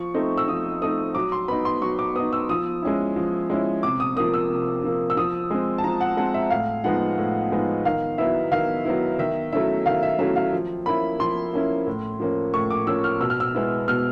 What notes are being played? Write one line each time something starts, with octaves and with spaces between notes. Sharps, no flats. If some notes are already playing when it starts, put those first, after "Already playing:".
Already playing: F3 C#6
A3 C4 D#4
E6
F3 D#6
A3 C4 D#4 D#6
F#3 D6
C6
B3 D#4 B5
C6
F#3 C#6
D6
B3 D#4 D#6
E6
F3 D#6
G#3 C#4 E4
F3
G#3 C#4 E4
C3 D6
D#6
F3 A#3 D#6
E6
C3
F3 A#3
E6
F3 D#6
G#3 C4
A5
F3 A#5
F#5
G#3 C4 F#5
E5
A2 F5
F3 G#3 B3 D#4 F#5
A2
F3 G#3 B3 D#4
D#3 F5
F#3 B3 E4 E5
D#3 F5
F#3 B3 E4
D#3 E5
F#3 A3 C#4 E4 E5
D#3 F5
E5
F#3 A3 C#4 E4 E5
F5
F3
A#3 C#4 E4 B5
F3 C6
A#3 C#4 E4
A2
F3 A#3 C#4
A2 C#6
D6
F3 A#3 C#4 E6
F6
B2 E6
F6
E6
G#3 B3 E4
B2 F6